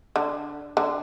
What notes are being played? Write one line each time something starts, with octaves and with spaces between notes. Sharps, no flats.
D3
D3